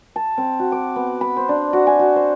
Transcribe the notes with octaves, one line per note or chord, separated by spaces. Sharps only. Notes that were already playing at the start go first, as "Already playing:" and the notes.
A5
C4
F#4
D6
B3
B5
C5
D4
F#4
G#5
F#4
C5